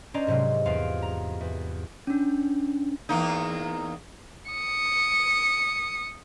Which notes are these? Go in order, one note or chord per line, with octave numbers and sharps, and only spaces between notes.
C#4 D4 C5 D5 D#5 A#5
G#2 C3 F#3 G#3
E2 F4 F5 D7
A#5
E2
C#4 D4
E2 A#3 D#4
D#6 C#7